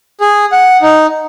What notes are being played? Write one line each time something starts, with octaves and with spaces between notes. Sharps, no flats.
G#4
F#5
D#4